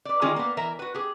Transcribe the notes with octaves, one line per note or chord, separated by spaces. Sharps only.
B4 D5
D#3 G#3 C#4 F4 G#4 D5
A#3 B3
E3 A#4 E5 A#5
F#4 B4
G4 G#4